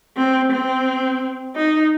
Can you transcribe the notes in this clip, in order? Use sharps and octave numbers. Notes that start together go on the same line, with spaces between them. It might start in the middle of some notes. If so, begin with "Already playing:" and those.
C4
C4
D#4